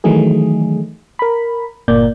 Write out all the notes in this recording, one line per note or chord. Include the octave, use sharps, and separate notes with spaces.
D#3 E3 F#3 A3 D#4 G#4
A#4 B5
G1 A#2 A#3 D5 G6